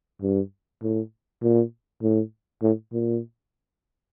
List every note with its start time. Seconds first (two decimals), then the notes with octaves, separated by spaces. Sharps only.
0.22 G2
0.82 A2
1.43 A#2
2.02 A2
2.62 A2
2.93 A#2